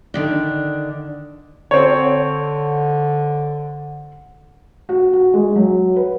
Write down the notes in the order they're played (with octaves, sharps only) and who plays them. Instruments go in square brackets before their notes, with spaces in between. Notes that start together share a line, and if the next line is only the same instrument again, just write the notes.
[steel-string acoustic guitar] D3 D#3 D4
[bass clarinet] D3 [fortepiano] C4 C#5
[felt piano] F#4
F#4
G#3
F#3
B4